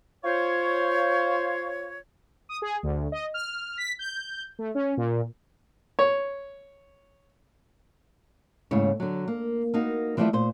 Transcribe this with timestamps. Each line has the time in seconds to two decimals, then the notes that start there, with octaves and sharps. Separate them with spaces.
0.24 F4 C5 C#5
2.49 D#6
2.62 G#4
2.83 D2
3.12 D#5
3.34 F6
3.77 B6
3.99 G6
4.59 A3
4.75 C#4
4.97 A#2
5.99 C#5
8.71 D#2 G#2 C#3 A3 E4 C#5
9.00 D3 F#3
9.28 A#3
9.74 A#3 B3 D#4 F#4
10.17 E3 F3 G3 A3 D5 E5
10.33 A#2 C5